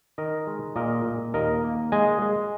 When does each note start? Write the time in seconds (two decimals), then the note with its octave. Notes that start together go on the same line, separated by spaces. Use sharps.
0.18 D#3 A#4 D#5
0.47 G#3
0.76 A#2 A#4 D#5
1.05 A#2
1.34 D#2 A#4 D#5
1.64 A#3
1.92 G#3 D#5 G#5
2.22 G#3